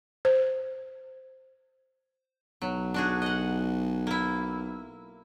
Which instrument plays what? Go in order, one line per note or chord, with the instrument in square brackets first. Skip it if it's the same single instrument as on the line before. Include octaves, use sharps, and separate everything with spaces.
[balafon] C5
[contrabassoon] B1 [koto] F#3
[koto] D4 F#4 G#4
D#5 F#5
A#3 E4